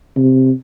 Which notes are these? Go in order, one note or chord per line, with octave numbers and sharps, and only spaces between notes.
C3